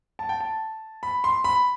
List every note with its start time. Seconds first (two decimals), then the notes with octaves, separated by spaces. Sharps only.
0.19 A5
0.29 G5
0.40 A5
1.03 B5
1.24 C6
1.44 B5